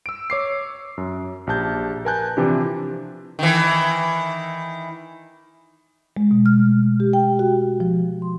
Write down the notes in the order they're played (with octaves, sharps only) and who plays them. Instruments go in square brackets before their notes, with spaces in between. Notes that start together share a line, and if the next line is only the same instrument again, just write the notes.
[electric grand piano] E6 D7
C#5 D6 C7
F#2
A#1 G4 A5 G6
A#4 B4 G#5 A5 F#6 G6
C3 E3 F3 D4 G4
[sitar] D#3 E3
[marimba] G#3
B2
F6
A3
G4
G5
F#4
F3
C6